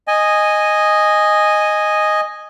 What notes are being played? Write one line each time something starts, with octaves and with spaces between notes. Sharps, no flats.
D#5 G#5